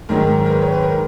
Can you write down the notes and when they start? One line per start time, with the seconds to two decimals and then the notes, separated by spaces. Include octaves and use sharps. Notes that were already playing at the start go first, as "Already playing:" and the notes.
0.09 G#2 D#3 F#3 A#4
0.46 A#4
0.51 B4
0.61 C#5
0.72 B4
0.83 A#4